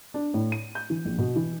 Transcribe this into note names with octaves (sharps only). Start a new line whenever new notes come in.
D4
A2
D#7
G6
E3
A#1
B2
E3